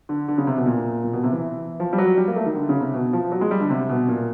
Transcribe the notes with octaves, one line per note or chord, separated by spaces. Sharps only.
D3
D3
C#3
C3
B2
A#2
A#2
B2
C3
E3
F3
G3
F#3
G3
A#3
A3
D#3
D3
C#3
C3
B2
F3
F#3
G#3
G3
D3
C3
B2
A#2